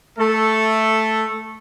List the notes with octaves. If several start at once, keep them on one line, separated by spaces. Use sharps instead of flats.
A3 A4